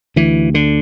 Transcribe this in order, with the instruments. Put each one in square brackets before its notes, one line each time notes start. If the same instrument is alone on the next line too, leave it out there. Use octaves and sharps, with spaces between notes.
[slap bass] D2 E3
D3